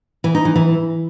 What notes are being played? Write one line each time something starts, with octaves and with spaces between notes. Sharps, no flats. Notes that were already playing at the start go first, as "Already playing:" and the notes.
E3
D#4
E3
E3